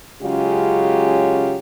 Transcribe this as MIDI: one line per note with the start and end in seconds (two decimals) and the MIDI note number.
0.22 1.59 49
0.22 1.59 54
0.22 1.59 56
0.22 1.59 61
0.22 1.59 65
0.22 1.59 67